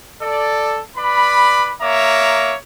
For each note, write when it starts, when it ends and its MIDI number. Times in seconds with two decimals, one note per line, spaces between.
0.22 0.81 69
0.22 0.81 74
0.98 1.73 71
0.98 1.73 74
0.98 1.73 83
1.82 2.56 58
1.82 2.56 73
1.82 2.56 76
1.82 2.56 82
1.82 2.56 86